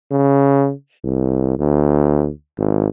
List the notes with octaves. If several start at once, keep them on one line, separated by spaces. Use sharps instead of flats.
C#3
C2
D2
G#1